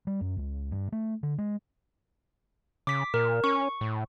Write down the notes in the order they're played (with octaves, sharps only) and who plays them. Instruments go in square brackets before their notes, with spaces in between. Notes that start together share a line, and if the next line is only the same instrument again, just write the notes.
[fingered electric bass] G3
F#2
C#2
G2
A3
D3
G#3
[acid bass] C#3 [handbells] D6 B6
[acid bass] A#2 [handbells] A#4
[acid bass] C#4 [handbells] C#6
[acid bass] A2